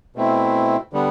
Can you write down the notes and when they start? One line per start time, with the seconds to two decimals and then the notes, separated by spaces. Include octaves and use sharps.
0.16 B2 A3 C4 E4
0.93 D3 G3 B3